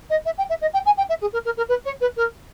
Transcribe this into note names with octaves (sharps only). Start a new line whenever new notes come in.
D#5
E5
G5
E5
D#5
G5
G#5
G5
E5
G#4
A#4
A#4
A#4
B4
C#5
B4
A#4